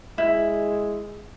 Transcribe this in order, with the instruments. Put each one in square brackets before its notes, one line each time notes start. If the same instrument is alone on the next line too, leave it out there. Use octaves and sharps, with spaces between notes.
[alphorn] G#3 [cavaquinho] E4